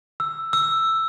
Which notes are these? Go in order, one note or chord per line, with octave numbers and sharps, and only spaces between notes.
E6
E6